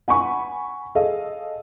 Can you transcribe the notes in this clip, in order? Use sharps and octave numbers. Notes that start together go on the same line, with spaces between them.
F#5 G#5 B5 C#6
G#4 A4 D#5 F5